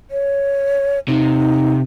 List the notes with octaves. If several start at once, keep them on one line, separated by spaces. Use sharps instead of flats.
C#5
C3 D#4